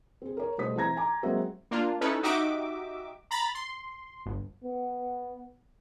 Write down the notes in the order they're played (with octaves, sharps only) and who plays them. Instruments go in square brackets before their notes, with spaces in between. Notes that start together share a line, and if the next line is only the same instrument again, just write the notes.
[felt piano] C4 G#4
A#4 C#5
B2 G3 A3 C5 D#6 B6
E3 C4 A#5 G#6 A#6
G#5 A#5 D6
F#3 G#3 A#3 C4 F#4 E5
[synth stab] A#3 D4 F4
C#4 D#4 E4 A4 B4
D#4 F#4 G4 D#5 E5 D6
A#5 B5 A6
C6
G1
[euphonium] B3